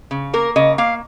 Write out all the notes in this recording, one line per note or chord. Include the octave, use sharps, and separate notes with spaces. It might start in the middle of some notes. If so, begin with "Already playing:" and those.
C#3
A#3 A#4
C#3 D#5
A#3 F5